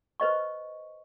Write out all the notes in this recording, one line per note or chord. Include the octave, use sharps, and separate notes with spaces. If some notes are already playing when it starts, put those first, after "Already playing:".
B4 C5 D#5 C#6